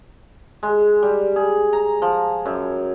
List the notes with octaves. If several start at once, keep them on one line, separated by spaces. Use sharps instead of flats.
G#3
G3
G#4
A#5
F3
F#2